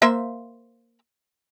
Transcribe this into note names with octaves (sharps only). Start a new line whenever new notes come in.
A#3 C5 E5